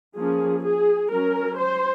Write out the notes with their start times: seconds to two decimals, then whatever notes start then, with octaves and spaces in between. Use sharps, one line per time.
0.16 F3 A#3 C#4 G#4
0.63 G#4
1.11 F#3 C#4 A#4
1.58 C5